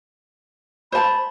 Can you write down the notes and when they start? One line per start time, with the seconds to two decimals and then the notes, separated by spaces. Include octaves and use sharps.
0.92 C5 A5 B5